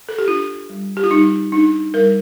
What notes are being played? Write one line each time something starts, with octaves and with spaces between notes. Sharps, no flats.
A4
G4
D4 F4
G3
G4
F4
G3 D#4
D4 D#4
G3 A#4